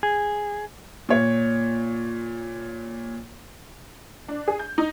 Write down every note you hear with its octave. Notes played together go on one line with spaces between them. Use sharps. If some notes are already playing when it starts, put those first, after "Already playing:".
G#4
A#2 C#5
D4
G#4
G6
D#4